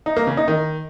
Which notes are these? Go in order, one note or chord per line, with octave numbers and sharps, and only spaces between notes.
D#4
A#3
C#3
D#4
D#3